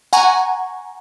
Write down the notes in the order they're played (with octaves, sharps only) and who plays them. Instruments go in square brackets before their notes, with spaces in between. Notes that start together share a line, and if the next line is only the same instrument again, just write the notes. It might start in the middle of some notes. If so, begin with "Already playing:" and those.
[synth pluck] F#5 G#5 A#5 C#6